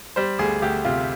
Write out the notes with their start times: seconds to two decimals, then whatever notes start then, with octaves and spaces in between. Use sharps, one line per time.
0.16 G3 C5
0.39 D2 G#4
0.62 D2 G4
0.85 C3 F4